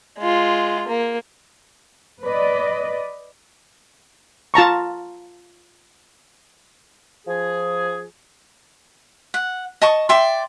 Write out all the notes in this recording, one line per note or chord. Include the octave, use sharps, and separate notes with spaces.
G#3 F4
A#3
B4 D5 D#5
F4 A5 A#5 C#6
F3 G#4
F#5
D#5 A5 C#6
D5 E5 G5 C6